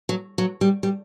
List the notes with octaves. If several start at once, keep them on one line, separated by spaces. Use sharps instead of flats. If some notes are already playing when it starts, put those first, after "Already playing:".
F#3
F#3
G3
G3